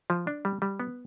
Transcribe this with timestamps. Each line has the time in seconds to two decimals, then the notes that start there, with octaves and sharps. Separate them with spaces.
0.10 F3
0.27 D4
0.45 G3
0.62 G3
0.80 B3